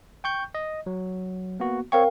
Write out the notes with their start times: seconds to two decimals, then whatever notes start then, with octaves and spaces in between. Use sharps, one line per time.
0.24 G5 C#6 G6
0.55 D#5
0.86 F#3
1.60 A#3 B3 F#4
1.92 C4 A#4 C#5 F5 G5 C#6